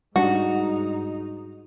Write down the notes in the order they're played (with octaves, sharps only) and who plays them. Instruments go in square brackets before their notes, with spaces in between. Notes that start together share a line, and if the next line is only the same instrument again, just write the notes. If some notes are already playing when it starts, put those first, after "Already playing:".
[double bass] G#2 D#4 [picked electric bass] G3 A3 D4 [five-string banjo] F#4